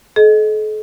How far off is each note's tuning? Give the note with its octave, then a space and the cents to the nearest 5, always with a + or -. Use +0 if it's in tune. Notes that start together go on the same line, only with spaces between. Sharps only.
A4 -45 D#5 +0